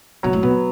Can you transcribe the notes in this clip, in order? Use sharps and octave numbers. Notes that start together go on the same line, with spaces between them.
B2 F#3
A2
B2 B3